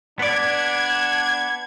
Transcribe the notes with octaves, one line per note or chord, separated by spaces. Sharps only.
B3 D4 D5 G#6